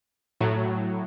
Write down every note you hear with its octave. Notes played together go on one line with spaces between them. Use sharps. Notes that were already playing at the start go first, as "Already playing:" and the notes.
A2 F#3